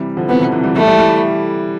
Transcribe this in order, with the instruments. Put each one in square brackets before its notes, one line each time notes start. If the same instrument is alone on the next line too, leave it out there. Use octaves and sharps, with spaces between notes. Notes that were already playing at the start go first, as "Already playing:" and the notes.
Already playing: [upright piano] C3 E3 G3
D3 F3
[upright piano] C3 E3 [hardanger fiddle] B3
[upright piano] B2 D3
C3 E3
E3 G3
[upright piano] E3 G3 [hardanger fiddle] A3
[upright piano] E3 G3
E3 G3